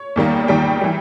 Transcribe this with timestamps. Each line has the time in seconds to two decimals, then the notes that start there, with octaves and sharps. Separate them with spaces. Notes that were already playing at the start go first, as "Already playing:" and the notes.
Already playing: C#5
0.16 E2 D#3 G3 A#3
0.48 E2 D#3 G3 A#3 G5
0.81 E3 G3